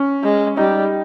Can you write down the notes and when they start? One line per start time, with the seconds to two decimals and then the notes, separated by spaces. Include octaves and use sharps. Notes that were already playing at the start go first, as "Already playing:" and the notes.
Already playing: C#4
0.23 G#3
0.57 G3 D#4